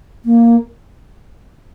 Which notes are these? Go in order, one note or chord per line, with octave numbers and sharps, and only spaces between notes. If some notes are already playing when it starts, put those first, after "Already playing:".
A#3